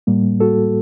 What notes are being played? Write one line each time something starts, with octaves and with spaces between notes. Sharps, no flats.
A2 G3 A#3
F#4 A4